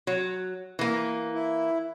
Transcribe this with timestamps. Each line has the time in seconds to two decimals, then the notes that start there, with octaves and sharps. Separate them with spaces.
0.07 F#3
0.79 E3 A#3
1.34 E4